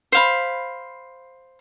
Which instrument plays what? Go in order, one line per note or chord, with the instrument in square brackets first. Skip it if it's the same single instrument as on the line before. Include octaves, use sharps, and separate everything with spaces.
[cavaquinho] C5 F5 B5